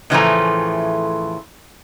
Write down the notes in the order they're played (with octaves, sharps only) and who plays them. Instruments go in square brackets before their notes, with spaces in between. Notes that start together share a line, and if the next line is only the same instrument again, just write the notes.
[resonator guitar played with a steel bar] A2 C#3 E3 F3 A3 A#5